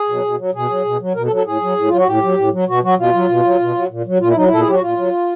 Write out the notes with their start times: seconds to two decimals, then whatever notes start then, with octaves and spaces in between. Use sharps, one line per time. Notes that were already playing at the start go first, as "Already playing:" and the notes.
Already playing: G#4
0.09 B2 F#3
0.24 B2
0.38 F#3
0.54 B2 G#4
0.70 F#3
0.85 B2
1.01 F#3
1.15 B2 A#4
1.25 A4
1.31 F#3
1.36 A4
1.46 A2 G#4
1.61 F#3
1.77 A2
1.88 F#3 F4
1.98 F#4
2.06 A2 G4
2.23 F#3
2.37 A2
2.52 F#3
2.68 B2 F#4
2.83 F#3 F#4
2.98 B2 F4
3.14 F#3
3.29 B2
3.44 F#3
3.60 B2
3.75 F#3
3.90 A#2
4.06 F#3
4.20 A#2 F4
4.28 E4
4.36 F#3 D#4
4.45 E4
4.51 A#2 A4
4.60 G#4
4.67 F#3 G4
4.75 F#4
4.82 A#2 F4
4.97 F#3